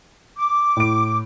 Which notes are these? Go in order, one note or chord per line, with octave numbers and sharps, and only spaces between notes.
D6
A2 D7